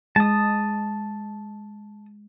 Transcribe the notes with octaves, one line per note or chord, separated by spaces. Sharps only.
G#3 A5 D#6